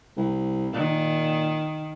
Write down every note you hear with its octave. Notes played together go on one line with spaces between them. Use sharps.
C2
A#2 D#3